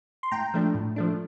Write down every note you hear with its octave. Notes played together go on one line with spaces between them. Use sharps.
C6
A2 G5 A#5
F3 A3 D4
A2
F3 A3 D4